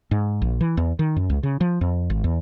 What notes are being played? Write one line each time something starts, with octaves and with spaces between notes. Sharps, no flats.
G#2
A#1
E3
E2
D#3
F#2
C#2
C#3
F3
F2
G#1
E2